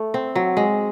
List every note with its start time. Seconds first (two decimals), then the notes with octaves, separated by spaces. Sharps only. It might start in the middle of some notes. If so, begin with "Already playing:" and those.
Already playing: A3
0.14 C4
0.35 F#3
0.57 G#3